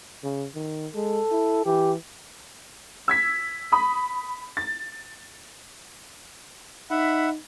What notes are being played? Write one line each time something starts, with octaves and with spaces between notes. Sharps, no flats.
C#3
D#3
G#3 A4
E4
E3 G4
E6 G#6 B6
B5 D#6
A6
D#4 E5 F#5 B5